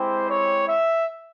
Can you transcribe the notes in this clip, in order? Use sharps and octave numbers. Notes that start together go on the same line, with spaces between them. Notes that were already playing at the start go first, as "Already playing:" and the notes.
Already playing: G#3 C4 E4 G4 C5
C#5
E5